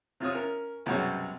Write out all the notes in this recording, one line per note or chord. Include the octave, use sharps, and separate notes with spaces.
C3 F4 C#5 D#6
C#4 A#4
C2 F#2 B2 G#3 F#4 C#5